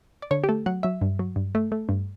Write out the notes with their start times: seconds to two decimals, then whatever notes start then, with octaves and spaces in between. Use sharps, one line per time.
0.22 D5
0.31 D3 C#5
0.44 G4
0.49 A3 A4
0.66 F#3 F#5
0.83 F#3 E5
1.01 G2
1.19 F#3
1.36 G2
1.55 A3
1.72 A3
1.89 G2